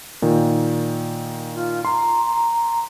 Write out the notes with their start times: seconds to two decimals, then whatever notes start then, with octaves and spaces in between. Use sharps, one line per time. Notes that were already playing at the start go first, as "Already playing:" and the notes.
0.22 A#2 D#3
1.52 F4
1.85 A#5 C6